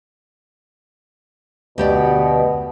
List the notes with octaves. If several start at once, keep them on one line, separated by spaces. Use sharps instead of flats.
D2 B2 G4 D5